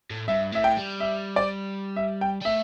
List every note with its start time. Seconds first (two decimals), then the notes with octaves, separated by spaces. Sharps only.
0.10 A2
0.28 G2 E5
0.52 A2 E5
0.64 G5
0.77 G3
1.00 E5
1.36 D5
1.96 E5
2.21 G5
2.42 G3
2.45 A3 E5